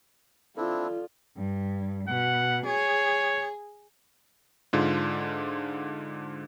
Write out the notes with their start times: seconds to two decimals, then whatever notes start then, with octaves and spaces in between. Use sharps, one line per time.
0.57 C4 D4 E4 F4 A4 D5
1.36 G2
2.08 B2 F#5
2.66 G#4 C#5
4.73 G#2 D3 F4